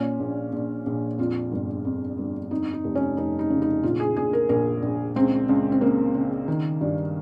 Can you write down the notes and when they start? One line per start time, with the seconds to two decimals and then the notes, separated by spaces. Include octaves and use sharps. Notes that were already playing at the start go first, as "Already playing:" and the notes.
Already playing: A#2 C#4
0.19 A#1
0.53 A#1
0.86 A#1
1.18 F2 F4
1.52 G1
1.85 F2
2.18 G1
2.51 F2 D#4
2.73 D#4
2.84 F1
2.95 C#4
3.17 F1 D#4
3.39 D#4
3.50 C#3
3.62 D#4
3.83 A#1 F4
4.00 G#4
4.16 A#1 G#4
4.33 A#4
4.49 A#1 A#4
4.83 A#1
5.16 C#2 C4
5.49 C#2
5.72 C4
5.81 C#3 A#3
6.15 C#3
6.48 D#3
6.81 G2